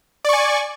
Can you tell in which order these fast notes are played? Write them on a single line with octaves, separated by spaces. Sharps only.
D5 C#6 G#5